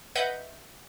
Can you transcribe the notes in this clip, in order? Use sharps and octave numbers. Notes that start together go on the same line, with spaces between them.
B4 D#5 E5 F#5 G6